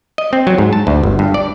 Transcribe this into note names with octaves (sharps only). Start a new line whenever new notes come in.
D#5
C4
F#3
G#2
A5
D2
G1
G2
D5